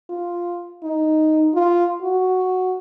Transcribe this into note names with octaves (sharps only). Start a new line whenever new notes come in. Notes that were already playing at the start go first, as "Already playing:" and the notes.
F4
D#4
F4
F#4